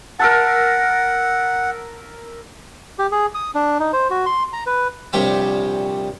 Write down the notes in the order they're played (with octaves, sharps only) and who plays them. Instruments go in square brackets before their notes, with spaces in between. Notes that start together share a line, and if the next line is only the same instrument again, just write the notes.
[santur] A#4 E5 A5 [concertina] F#5
[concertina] G4
G#4
D#6
D4
D#4
C5
F#4
C6
A#5
B4
[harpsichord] A#1 C3 G3 G4 C#5 E5